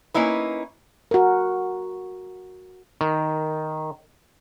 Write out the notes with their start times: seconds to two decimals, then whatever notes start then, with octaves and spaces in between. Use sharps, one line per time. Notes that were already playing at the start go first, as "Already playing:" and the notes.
0.14 A#3 C#4 D#4 E4 B4
1.11 F#4 A#4
3.01 D#3